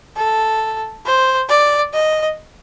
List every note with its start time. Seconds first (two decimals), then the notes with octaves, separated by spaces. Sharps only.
0.17 A4
1.06 C5
1.49 D5
1.94 D#5